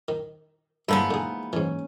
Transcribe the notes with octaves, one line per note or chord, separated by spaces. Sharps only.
D#3
G2 D3 E3 F3 G#3 A#3 B3 E4
D3 D#4 G#4
G#2 E3 C#4